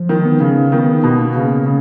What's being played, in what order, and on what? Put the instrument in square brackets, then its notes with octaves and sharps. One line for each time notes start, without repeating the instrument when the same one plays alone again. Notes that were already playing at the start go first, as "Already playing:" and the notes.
Already playing: [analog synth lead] F3
[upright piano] D#3
[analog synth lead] B3
[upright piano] C#3
[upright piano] D#3 [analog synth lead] B3
[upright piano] B2
[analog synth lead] A#3
[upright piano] C#3
C#3